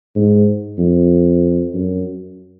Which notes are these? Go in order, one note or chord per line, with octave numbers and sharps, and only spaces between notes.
G#2
F2
F#2